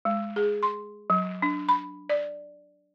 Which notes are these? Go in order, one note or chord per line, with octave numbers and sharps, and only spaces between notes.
G#3
G#4
C6
F#3
D4
B5
D5